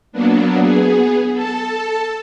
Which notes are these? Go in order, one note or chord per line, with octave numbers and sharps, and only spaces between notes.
F#3 A#3 B3 D4
B3 G#4
A4 A5